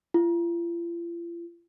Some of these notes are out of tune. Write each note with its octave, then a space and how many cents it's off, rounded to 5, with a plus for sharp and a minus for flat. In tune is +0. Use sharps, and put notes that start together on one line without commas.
F4 -45